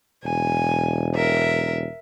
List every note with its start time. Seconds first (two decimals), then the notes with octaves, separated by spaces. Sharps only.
0.24 E1 G#5
1.14 A#4 E5